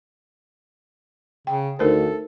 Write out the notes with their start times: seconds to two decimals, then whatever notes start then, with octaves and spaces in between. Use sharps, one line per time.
1.47 C#3 G5
1.79 D2 D#4 A4 A#4 C5